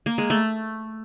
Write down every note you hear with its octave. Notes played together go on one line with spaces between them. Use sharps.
A#3
G#3
A3